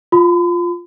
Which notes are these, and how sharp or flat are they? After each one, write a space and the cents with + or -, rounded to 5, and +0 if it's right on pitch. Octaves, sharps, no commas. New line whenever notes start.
F4 +0 B5 +45